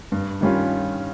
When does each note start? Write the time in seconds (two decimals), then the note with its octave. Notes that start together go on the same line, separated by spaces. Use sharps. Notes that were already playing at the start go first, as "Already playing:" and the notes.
0.12 G2
0.41 D#3 G3 C#4 F4